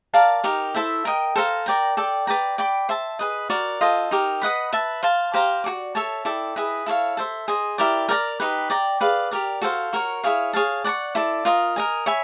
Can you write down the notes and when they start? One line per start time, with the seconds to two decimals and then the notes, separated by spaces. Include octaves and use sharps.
0.14 A#4 D5 F5 A5
0.44 D#4 G4 A#4
0.74 E4 A4 C5 E5
1.05 A#4 D#5 G5
1.36 A4 C5 F5 A#5
1.66 A#4 D5 G5 A#5
1.97 A4 D5 G5
2.27 B4 D5 G5 A#5
2.58 D5 G5 B5 D6
2.89 C5 E5 A5
3.19 G#4 B4 D#5
3.50 F#4 A#4 D5
3.81 F4 A4 C5 D#5
4.11 D#4 G4 A#4
4.42 B4 D#5 F#5 B5
4.73 B4 E5 A5
5.03 C5 F5 A5
5.34 G4 C5 F5 A#5
5.64 F#4 A4 D5
5.95 A4 C#5 E5 A5
6.25 E4 A4 D5 G5
6.56 E4 G#4 B4 D#5
6.86 E4 A4 C#5 F5
7.17 A4 C5 E5
7.48 G#4 C5 D#5
7.78 E4 G4 A#4 D5
8.09 A#4 D5 G5 A#5
8.40 D#4 G4 B4
8.70 D5 G5 A#5
9.01 G#4 B4 D5 F5
9.31 G4 A#4 D5
9.61 F#4 A4 C5 F5
9.93 F#4 A#4 C#5
10.24 E4 G#4 C#5 F5
10.53 G#4 C#5 F5 A5
10.84 D5 F#5 A5 C#6
11.15 E4 A4 D5
11.45 F4 A#4 D#5
11.76 A#4 D#5 G#5
12.06 C#5 E5 G#5 B5